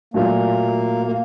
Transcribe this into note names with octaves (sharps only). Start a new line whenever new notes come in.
A#2 F#3 A3 A#3
A#3